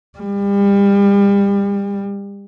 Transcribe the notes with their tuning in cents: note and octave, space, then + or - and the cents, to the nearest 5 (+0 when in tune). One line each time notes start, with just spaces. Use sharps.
G3 +35